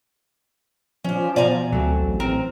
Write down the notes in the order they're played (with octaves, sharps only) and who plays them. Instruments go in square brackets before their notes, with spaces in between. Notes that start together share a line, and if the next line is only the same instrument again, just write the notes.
[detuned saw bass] F3 [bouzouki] C#4 D4
[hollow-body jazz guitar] B2 [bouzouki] D5 G#5 A#5
[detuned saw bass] D2 [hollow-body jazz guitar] F#3 A3 C4
[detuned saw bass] A1
[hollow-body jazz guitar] C4 [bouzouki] A#4